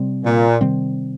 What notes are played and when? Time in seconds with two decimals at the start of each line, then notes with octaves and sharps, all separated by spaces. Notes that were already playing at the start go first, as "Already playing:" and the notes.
Already playing: C3 G3 C4
0.25 A#2
0.61 C3 D#3 G3 C4